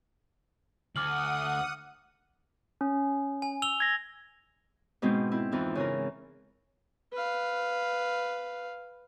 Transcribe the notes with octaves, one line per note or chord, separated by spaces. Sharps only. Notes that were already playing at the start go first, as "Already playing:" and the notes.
D2 F#5 D6 D#6 F6 F#7
C#4
G#5
E6 F7 G7
G#6 A#6
G#2 B2 G#3 C4
C4 E4
F2 E3 D#4 F4
C#3 E3 A#4
B4 F5